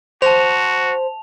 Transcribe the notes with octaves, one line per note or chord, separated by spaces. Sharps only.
F#4 C5 A5 F7